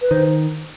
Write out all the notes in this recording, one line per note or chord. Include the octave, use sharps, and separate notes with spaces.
B4
D#3 C5